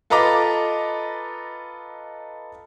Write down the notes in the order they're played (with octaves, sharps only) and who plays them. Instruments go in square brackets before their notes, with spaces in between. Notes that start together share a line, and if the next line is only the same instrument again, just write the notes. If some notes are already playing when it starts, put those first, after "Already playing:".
[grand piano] F4 A4 B4 D#5 A#5 D6